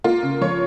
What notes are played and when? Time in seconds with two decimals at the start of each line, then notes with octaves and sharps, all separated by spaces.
0.04 A#3 F4
0.23 C#3
0.41 F3 C#5